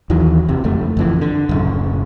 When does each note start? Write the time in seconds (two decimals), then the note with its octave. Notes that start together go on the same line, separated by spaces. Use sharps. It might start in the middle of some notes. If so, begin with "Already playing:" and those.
0.10 D#2 D#3 E3 F#3
0.49 F1 C3
0.64 F#1 F2 A3
0.97 F#1 F2 E3
1.21 D3
1.49 D1 F#2 C#3